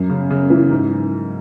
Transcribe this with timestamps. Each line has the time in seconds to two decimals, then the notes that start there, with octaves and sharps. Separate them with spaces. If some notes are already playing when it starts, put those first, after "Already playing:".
Already playing: F#2
0.10 C#3
0.30 C#3
0.50 E3
0.71 G#2